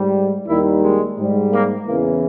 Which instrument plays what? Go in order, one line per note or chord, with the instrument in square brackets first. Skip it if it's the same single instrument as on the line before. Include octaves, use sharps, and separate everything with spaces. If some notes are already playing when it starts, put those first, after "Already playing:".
Already playing: [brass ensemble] G#2 G3
D#2 D#3 G3 E4
G#3
G#2 G3
A#3
E2 C#3 E3 A#3